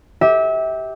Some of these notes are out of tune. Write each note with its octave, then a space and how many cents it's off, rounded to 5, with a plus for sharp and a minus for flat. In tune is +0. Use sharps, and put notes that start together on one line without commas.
G4 +0 E5 -30